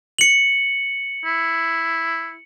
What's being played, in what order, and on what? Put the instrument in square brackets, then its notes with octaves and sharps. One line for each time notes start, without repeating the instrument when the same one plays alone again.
[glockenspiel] C#7 F#7
[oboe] E4